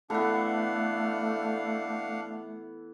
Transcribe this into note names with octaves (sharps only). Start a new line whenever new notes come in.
E3 A3 B3 D4 A4 F5 F#5